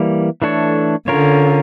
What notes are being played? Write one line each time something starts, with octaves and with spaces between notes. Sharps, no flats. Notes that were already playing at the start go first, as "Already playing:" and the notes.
Already playing: E3 G3 A#3
E3 A3 D4 A4 C#5
D3 C#4 F4 A#4 C#5